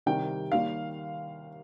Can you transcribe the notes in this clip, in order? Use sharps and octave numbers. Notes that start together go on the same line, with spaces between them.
C2 C3 D#3 G3 G5
D#2 D#3 G3 F5